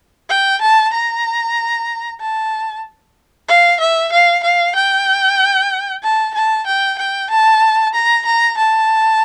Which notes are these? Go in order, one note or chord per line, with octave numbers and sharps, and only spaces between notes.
G5
A5
A#5
A5
F5
E5
F5
F5
G5
A5
A5
G5
G5
A5
A#5
A#5
A5